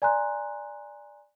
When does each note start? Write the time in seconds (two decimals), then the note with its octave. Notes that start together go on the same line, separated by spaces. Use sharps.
0.02 D5 G#5 A#5 C6 F#6